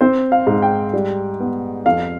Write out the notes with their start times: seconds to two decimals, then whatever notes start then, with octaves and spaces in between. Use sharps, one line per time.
0.01 C4 C5
0.32 F5
0.47 G#2
0.62 G5
0.93 G3
1.40 B3
1.85 F2 F5